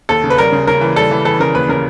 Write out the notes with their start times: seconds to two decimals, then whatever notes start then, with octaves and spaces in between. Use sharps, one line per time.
0.09 D#2 A4
0.24 C#3
0.30 B4
0.38 G3 A#4
0.52 C#3
0.67 C#3 A#4
0.81 E3
0.96 G3 A4
1.11 E3
1.25 E3 A4
1.40 C#3 A#4
1.55 D#2 B4
1.69 C#3 A#4